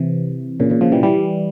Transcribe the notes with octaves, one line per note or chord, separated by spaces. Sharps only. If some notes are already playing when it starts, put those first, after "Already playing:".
Already playing: C3 E3
A#2 C#3
A#2 C#3
C#3 F3
E3 G3
E3 G3